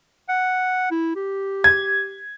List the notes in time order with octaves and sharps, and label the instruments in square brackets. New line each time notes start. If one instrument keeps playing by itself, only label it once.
[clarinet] F#5
E4
G4
[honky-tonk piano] G#6